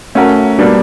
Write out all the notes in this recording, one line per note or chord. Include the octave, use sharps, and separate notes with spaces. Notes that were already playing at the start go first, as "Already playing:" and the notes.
A3 C#4 F#4 A#4
B2 G3 A#3 D4